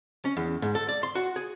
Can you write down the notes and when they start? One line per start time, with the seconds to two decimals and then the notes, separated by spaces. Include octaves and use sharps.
0.25 C#4
0.37 E2
0.62 G#2
0.75 A4
0.89 D5
1.03 C6
1.15 F#4
1.36 G#4